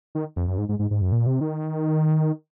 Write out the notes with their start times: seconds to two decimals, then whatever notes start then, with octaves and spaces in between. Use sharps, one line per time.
0.15 D#3
0.36 F2
0.47 F#2
0.58 G#2
0.69 G#2
0.79 G#2
0.91 G#2
1.02 F#2
1.12 A#2
1.26 C3
1.41 D#3